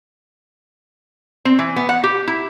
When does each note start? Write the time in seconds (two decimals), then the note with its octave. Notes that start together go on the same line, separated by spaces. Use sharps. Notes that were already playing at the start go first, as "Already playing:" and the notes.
1.45 C4
1.59 E3
1.76 B3
1.89 F#5
2.04 G4
2.27 E4